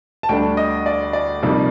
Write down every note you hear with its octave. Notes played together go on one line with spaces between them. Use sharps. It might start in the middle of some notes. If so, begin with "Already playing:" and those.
A5
D2 D3 G3 D4 G5
D#5
D5
D5
F2 C3 G3 A#3 D#4